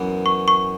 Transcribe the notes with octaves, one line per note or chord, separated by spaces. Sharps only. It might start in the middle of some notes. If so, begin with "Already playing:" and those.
Already playing: F#2 E3 B3
C#6
C#6